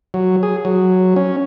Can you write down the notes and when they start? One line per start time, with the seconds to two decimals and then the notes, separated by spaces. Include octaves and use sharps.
0.14 F#3
0.43 G#4
0.65 F#3
1.16 C#4